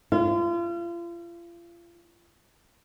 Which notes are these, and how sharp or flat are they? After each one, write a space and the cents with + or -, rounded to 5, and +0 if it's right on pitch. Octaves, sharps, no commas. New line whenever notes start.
F4 -35